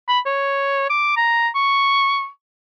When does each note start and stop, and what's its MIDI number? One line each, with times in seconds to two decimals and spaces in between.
0.08 0.19 83
0.26 0.88 73
0.90 1.15 86
1.16 1.48 82
1.55 2.28 85